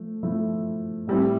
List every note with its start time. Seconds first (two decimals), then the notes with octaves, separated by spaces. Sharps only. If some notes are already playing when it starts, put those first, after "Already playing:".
Already playing: F3 A3
0.23 F3 A3 E4
1.07 A2 G3 C4 E4